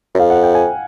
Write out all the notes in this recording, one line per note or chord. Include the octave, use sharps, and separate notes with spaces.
F#2
F2 F5
F#5
G5
G#5